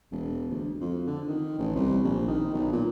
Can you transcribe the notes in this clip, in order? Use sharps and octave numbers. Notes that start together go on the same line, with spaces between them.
E1
D2
F2
D3
D#3
A1
C2
A#1
D#3
B1
A#2